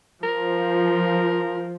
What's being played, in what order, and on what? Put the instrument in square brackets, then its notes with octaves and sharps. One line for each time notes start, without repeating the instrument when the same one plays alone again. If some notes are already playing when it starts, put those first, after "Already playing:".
[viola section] F3 [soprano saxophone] A#4